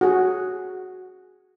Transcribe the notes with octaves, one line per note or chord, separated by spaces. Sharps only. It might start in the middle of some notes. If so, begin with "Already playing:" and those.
F#4 G#4